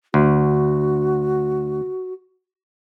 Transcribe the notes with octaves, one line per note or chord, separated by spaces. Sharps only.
D2 F#4